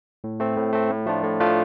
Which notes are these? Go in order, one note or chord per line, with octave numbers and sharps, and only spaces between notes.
A2
A3 C4
A2
A3 C4
A2
F3 A3 D4 F4
A2
F3 A3 D4 F4